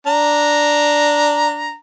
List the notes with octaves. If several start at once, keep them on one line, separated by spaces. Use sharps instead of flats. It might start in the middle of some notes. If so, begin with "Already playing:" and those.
D4 A#5